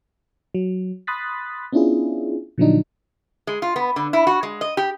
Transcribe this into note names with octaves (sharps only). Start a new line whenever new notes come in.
F#3
B5 C6 D#6 F#6 A6 B6
B3 C#4 D4 E4 F4 G#4
A#2 D3 F3 F#3 D4 D#4
G#3
F4
B3
D3
E4
F#4
G#3
D#5
G4